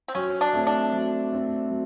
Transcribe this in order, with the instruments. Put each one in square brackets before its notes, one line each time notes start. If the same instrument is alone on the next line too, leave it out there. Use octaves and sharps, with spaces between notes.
[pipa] C4
[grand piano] F#3 [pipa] C#4
[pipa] D4
[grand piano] A3 C4
[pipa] D4
[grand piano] F#3
A3 C4
F#3